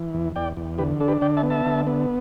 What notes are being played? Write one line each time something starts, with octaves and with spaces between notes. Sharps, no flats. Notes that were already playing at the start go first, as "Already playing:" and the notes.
Already playing: E3
E2
E2 D5 G5
E2
D3 G4 B4
D4 A4
G4 B4
D3 D5 G5
E5 A5
B3
E5 A5
D3
B3